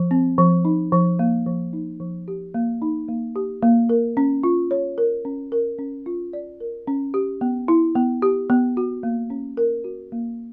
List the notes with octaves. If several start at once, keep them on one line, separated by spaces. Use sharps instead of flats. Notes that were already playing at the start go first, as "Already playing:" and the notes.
Already playing: F3
C4
F3
D#4
F3
A#3
F3
D#4
F3
G4
A#3
D#4
A#3
G4
A#3
A#4
C#4
F4
C#5
A#4
C#4
A#4
C#4
F4
D5
A#4
C#4
G4
B3
E4
B3
G4
B3
F#4
A#3
C#4
A#4
F#4
A#3